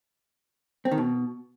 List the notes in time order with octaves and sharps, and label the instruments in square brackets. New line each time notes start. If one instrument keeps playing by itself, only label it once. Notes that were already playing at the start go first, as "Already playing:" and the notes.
[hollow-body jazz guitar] C4
D#3
B2